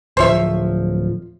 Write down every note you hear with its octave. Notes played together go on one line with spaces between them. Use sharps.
D1 F3 C5 C#5 E5